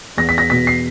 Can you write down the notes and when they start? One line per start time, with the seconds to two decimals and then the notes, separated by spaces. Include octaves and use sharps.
0.17 E2 A#6
0.29 B6
0.38 A#6
0.50 B2 B6
0.67 C7